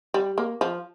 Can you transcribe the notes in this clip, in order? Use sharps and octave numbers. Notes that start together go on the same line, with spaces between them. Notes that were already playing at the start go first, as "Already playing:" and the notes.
G3
A#3
F3